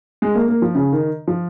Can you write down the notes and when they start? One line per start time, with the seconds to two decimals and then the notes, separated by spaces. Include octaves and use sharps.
0.22 G#3
0.35 A#3
0.48 A#3
0.62 F3
0.75 C#3
0.92 D#3
1.27 F3